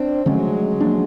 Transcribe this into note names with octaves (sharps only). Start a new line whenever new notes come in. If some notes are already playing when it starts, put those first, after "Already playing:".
Already playing: C4 D4
D3 F3 F#3 G#3 A3 C#4
F3 A#3 D4